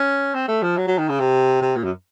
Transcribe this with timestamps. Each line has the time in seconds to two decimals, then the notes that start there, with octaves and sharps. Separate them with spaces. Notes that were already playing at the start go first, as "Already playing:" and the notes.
Already playing: C#4
0.34 C4
0.48 A3
0.62 F3
0.77 F#3
0.87 F#3
0.98 D#3
1.09 C#3
1.20 C3
1.62 C3
1.76 A#2
1.84 F#2